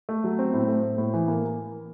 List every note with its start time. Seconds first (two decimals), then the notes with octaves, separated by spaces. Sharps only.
0.09 A3
0.24 F#3
0.39 C4
0.53 A2
0.68 A3
0.83 A3
0.98 A2
1.14 E3
1.28 A#3